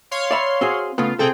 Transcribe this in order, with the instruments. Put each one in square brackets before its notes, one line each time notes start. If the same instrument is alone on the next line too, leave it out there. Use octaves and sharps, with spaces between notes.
[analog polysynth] C#5 F5 C6
[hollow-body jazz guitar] D5 E5 B5
C4 F#4 G#4
[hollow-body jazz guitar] C#3 A3 B3 [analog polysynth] F4
[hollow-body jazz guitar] C3 A4 [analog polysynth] C4 G#4 G5